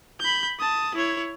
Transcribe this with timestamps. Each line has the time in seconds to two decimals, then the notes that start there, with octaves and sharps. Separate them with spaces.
0.20 B5 G6
0.59 A5 D#6
0.95 E4 C#5